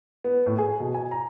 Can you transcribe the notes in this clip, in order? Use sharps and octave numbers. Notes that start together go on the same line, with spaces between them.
B3
A2
G#4
B2
G#5
A#5